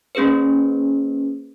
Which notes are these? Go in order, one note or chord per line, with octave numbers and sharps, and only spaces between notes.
A#3 C#4 G#4 B4 C5